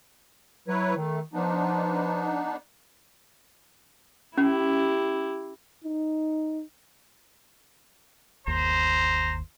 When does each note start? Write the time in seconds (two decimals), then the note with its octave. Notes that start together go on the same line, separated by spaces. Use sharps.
0.68 F#3 E4 B4 C#5
0.97 D#3 A3
1.33 F3 B3 D4 D#4
4.38 C#4 E4 G4
5.84 D#4
8.47 G1 D#2 C5 A#5